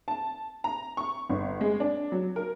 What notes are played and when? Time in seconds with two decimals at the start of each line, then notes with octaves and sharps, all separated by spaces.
0.08 A5
0.64 A#5
0.97 C#6
1.29 G1
1.61 G#3
1.80 D4
2.12 F#3
2.36 A#4